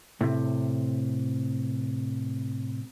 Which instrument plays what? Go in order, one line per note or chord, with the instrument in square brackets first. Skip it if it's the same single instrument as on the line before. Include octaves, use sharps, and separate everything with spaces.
[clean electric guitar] A2 C3